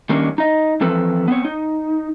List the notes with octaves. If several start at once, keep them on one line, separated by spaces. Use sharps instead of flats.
D#3 G3 A#3 C#4 D4
D#4 D#5
E3 F3 C4 A4 B4
B3 C4 C#5
D#4